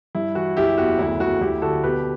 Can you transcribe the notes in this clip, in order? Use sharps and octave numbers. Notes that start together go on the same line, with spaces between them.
G2 E4
E3 F#4
F#1 E4 G4
E2 F#4
D2 E4
D2 F#4
D2 E4 G4
D3 F#4 A4
B2 G4 B4